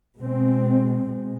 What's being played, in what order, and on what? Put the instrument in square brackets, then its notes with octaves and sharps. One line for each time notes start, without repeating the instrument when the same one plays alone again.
[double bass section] B2 G#3 C4
B2 G#3